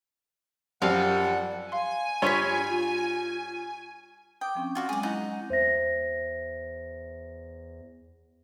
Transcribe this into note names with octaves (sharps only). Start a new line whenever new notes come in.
F#2 F3 G3 C4 F5 F#5
F5 G#5 C6
G2 F4 C#5 C6 B6
G5 D6 D#6
F3 C4 C#4
F4 F#4 D5
F#3 G#3 C4 G#4 D5
D#4 E4 F#5
E2 C5 E5 A#6